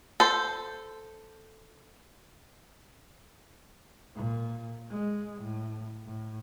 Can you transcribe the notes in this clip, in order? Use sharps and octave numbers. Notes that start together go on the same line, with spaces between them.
A4 C5
A#2
G#3
A2
A2